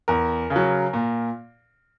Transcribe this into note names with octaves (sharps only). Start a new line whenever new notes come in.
E2 A#4
C#3
F#3
A#2